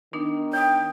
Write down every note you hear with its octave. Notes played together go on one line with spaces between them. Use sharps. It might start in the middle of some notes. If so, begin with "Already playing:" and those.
D#3 B3 D4 D#4
C#5 G5 D#6